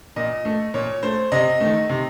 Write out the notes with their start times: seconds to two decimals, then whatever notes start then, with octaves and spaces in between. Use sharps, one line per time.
0.16 A#2 D#5
0.45 A3
0.74 A#2 C#5
1.03 A3 C5
1.32 C3 D#5
1.60 D#3 A3
1.89 C3